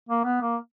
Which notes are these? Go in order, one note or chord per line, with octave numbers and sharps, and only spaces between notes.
A#3
B3
A#3